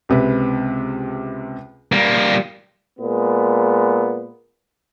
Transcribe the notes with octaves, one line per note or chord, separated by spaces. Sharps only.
C#2 C3 B4
G3 A#3
A#2 G#3 B3